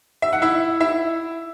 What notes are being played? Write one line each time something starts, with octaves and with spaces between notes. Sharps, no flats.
E5
F#5
E4 E5
E4 E5